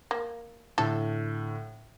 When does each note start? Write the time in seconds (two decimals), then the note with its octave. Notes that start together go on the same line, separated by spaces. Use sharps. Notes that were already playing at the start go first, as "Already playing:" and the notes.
0.11 A#3
0.78 A2 D3 A4